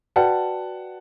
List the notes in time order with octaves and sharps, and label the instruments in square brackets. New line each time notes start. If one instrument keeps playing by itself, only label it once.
[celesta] F#4 B4 D5 G5 [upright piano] F#5 A5